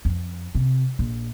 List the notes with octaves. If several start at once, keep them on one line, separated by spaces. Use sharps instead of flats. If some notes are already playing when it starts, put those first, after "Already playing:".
F2
C3
A#1